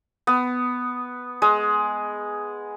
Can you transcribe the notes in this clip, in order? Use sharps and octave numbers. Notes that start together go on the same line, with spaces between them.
B3
G#3